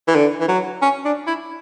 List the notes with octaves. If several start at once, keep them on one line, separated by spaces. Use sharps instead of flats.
E3
D3
E3
F#3
C#4
D4
E4